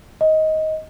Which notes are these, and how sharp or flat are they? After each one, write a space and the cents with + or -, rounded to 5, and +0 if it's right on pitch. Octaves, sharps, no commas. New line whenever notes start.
D#5 +15